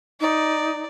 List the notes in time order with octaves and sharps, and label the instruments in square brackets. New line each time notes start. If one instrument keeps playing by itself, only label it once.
[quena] D#4 [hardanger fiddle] D5